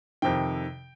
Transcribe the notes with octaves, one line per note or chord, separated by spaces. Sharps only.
F2 C3 D#3 G5